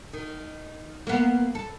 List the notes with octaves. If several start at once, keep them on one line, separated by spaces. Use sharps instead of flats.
D#3
A#3 B3
A4